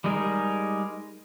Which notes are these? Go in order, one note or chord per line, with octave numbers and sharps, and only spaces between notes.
G3 G#3 D#4 G#4 A#4